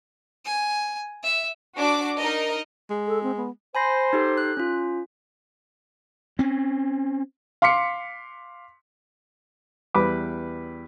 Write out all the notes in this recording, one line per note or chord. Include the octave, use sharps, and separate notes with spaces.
G#5
E5
D4 F#4 D6
D#4 A#4 D#5
G#3
A4
C4
B3
C5 G#5 B5 A#6
D#4 G4 A4
F#6
C#4 F4
C4 C#4
F5 C6 D6 B6 C#7
E2 G3 B4 B5 D6